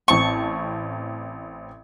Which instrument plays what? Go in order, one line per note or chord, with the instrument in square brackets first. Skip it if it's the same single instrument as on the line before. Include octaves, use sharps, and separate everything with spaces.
[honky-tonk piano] A1 C4 A5 [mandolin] C#6